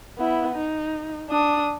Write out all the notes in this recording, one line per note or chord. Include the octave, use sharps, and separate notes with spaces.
B3 E4
D#4
D4 D#6